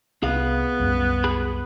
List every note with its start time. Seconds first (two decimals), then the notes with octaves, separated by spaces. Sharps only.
0.23 C2 B3 G#4 F5
0.80 C2 F#2 G3
1.24 G#4 B5